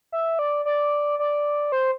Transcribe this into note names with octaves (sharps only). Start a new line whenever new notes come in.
E5
D5
D5
D5
C5